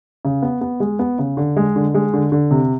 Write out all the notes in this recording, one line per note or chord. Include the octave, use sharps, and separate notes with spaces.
C#3
B3
B3
G#3
B3
C#3
D3
G#3
D3
G#3
D3
D3
C3